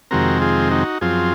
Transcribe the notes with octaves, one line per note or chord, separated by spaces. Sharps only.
F2 C3 D#3 G#3 C4 F#4 A#4
F4 G#4
D#4 F#4
F#2 F3 C4 F4 G#4